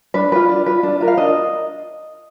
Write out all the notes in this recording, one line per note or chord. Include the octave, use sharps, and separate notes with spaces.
D4 B4
F4 B4
D4
F4 B4
D4
F4 A#4
F5
D4 D#5